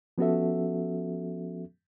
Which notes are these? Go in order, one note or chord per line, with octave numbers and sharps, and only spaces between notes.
F3 B3 C#4 F#4 A4 E5